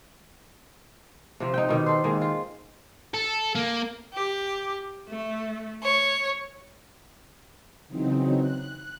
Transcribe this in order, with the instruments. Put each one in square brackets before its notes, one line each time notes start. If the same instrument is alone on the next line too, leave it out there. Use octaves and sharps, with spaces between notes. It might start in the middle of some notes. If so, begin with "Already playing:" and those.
[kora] C3 F3 C4
D#4 G5
B2 D#3 G4
A4 C5
D#3 G#3 A#3
F4
[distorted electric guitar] A4
A#3
[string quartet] G4
A3
C#5
[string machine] C#3 E3 F#3 C4 D#4
F#6